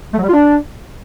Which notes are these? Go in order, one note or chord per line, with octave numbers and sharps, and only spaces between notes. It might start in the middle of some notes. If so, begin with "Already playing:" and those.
A3
F#3
G3
F4
D4